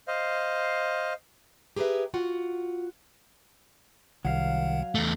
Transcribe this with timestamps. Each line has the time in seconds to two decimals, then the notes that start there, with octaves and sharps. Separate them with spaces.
0.08 C5 D#5 F5
1.76 G4 G#4 A#4 B4 E5
2.14 F4 F#4 F#5
4.25 C2 D#3 F#3 F5 F#5
4.95 E2 A3